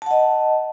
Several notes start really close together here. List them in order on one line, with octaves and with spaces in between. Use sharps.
A5 F#5 D#5